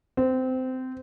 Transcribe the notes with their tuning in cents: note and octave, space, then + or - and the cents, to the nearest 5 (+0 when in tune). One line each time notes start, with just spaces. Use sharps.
C4 -20